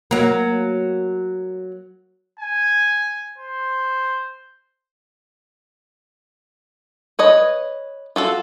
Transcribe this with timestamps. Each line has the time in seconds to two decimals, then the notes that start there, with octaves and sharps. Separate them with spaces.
0.11 F#3 A#3
2.40 G#5
3.39 C5
7.19 B4 C#5 D#5
8.16 F4 F#4 A4